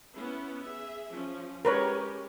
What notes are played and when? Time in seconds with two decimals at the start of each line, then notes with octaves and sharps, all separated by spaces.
0.15 B3 C#4 E4
0.62 G#4 E5
1.09 F3 C#4
1.65 G#3 C#4 G4 A#4 B4 C#5